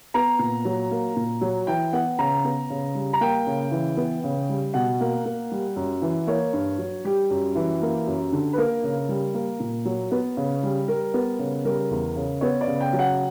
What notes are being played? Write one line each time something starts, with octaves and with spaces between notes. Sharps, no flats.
B3 A#5
A#2
F#3
A#3
A#2
F#3
E3 G5
B3 F#5
C#3 A#5
B3
C#3
G3
A#5
A#3 G5
C#3
E3
B3
C#3
G3
B2 F#5
A#3
A#3
G3
F#2
E3
A#3 C#5
G2
F#3
G3 G4
F#2
E3
A#3
F#2
D3
B4
A#3 A#4
C#3
G3
A#3
A#2
F#3
B3
C#3
G3
G3 A#4
B3
C#3
G3 A#4
E2
C#3
B3 C#5
D5
C#3
G5
F#3
F#5